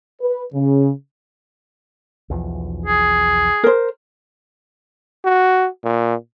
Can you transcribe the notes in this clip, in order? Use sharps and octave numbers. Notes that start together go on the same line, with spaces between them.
B4
C#3
B1 E2 F3
G#4
A#4 C5
F#4
A#2